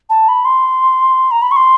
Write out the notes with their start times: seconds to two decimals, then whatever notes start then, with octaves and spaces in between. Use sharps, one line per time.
0.10 A5
0.28 B5
0.45 C6
1.31 A#5
1.42 B5
1.51 C#6
1.56 C6